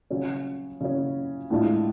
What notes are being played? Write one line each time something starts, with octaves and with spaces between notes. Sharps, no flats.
C#3 F#3 C#4
C#3 F#3 C#4
A2 G#3 D4 F4